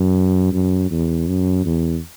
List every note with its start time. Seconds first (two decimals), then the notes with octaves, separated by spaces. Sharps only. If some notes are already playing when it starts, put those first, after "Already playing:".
Already playing: F#2
0.53 F#2
0.91 E2
1.28 F#2
1.65 E2